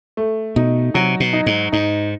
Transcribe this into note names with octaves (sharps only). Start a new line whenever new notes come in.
A3
B2 D#4
C3 F#3
B2
D#4
G#2
G#2 D#4